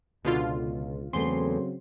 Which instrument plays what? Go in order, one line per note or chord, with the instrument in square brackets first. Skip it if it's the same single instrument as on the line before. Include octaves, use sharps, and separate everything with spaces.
[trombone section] C#2 [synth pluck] B2 D3 F4
[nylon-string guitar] E2 A3 [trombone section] C#3 F#3 C4 [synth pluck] C6